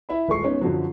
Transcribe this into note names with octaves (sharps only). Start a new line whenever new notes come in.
E4 E5 B5
D#1 G#3 A4 C#6 C7
G#3 B3 C#4 D#4
F#2 D3 F3 F#3